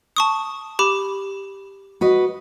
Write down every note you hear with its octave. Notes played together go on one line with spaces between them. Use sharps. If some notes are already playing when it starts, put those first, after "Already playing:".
A5 C#6 D#6
G4 B5 D6
F#4 B4 D#5